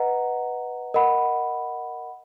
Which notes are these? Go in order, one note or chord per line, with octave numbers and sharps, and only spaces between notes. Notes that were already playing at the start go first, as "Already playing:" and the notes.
Already playing: B4 D#5 F#5 A#5
A#4 D#5 F#5 B5